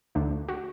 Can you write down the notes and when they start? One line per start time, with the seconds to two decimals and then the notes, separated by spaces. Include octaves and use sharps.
0.15 D2 D3 A3 D4
0.49 F#4